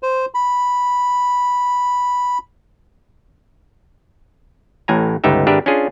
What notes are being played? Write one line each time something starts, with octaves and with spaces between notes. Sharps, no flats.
C5
B5
A1 A2 G#5 A#5
G1 C#2 B3 D#4 G4 E5
G#1 D4 G4 A#4 B4 E5
C#4 D4 F4 G#4